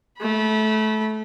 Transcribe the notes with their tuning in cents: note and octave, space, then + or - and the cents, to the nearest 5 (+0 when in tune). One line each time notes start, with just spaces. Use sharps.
A3 -20 B5 -25